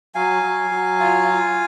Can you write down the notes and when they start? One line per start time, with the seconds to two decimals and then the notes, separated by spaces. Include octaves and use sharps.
0.15 F#3 F5 G#5
0.42 F#3
0.71 F#3
1.00 F4
1.29 F4